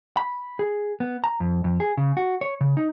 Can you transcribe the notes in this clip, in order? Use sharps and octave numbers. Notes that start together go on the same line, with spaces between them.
B5
G#4
B3
A#5
F2
F2
G#4
C#3
F#4
C#5
C#3
D#4